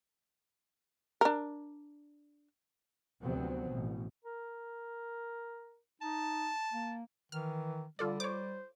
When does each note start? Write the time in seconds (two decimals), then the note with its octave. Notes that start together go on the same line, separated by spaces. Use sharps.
1.21 D4 A#4
3.22 D2 C3 F3 F#3 B3 C4
3.69 A1 B2
4.25 A#4
6.01 D#4 A5
6.73 A#3
7.32 D#3 E3 F6
7.99 D3 G3 F4 A4 D5
8.20 C5 C#5 D6